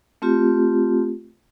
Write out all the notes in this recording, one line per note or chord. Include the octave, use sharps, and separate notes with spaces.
A3 C4 F4 G4